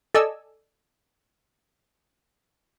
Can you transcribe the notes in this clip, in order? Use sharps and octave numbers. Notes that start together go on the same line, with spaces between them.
A4 D5 D#5 G#5 E6